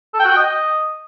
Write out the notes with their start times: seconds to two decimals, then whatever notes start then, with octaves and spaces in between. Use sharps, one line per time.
0.14 A4
0.19 G5
0.25 F#4
0.31 G5
0.36 D#5